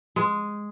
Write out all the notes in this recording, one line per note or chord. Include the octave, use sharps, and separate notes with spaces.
G#3